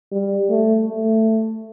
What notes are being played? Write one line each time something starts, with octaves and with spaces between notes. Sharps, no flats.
G3
A3
A3